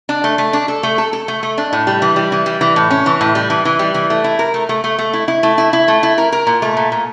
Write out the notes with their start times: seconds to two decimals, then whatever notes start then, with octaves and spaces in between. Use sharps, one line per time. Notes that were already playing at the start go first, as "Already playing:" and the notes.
0.09 D4
0.24 A3
0.38 A3
0.53 D4
0.68 A4
0.83 A3
0.98 A4
1.13 A4
1.28 A3
1.43 A3
1.58 D4
1.73 A2
1.87 G3
2.02 E3
2.16 G3
2.32 E3
2.46 G3
2.61 E3
2.76 A2
2.90 C#4
3.06 E3
3.21 A2
3.35 G3
3.50 E3
3.65 E3
3.79 G3
3.94 E3
4.10 A3
4.24 E4
4.39 A#4
4.54 A3
4.69 A3
4.84 A3
4.98 A3
5.13 E4
5.28 E4
5.43 A3
5.58 E4
5.73 E4
5.88 A3
6.03 E4
6.18 A#4
6.32 A#4
6.47 A#2
6.62 A3
6.77 A#2
6.92 A#2